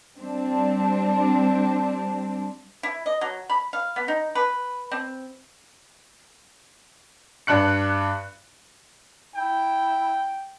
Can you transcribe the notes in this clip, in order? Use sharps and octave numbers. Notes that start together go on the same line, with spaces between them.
G3 C4 D4
E4
D#5
F#3
B5
F5
B3
D#4
B4
C4
G2 D4 F#6 C#7
E4 G5